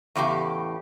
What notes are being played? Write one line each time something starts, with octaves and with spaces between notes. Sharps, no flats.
E2 A2 C#3 G4